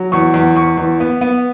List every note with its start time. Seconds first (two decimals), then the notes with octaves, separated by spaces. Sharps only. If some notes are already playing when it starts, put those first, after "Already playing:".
Already playing: F#3
0.12 E2 C#6
0.34 E2
0.56 E2 C#6
0.78 E2
1.00 B3
1.21 B3